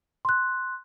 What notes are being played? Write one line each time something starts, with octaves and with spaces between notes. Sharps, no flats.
C6 F#6